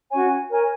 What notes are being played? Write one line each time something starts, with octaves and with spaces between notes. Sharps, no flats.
C#4 F#4 C#5 G#5
A#4 C#5 G#5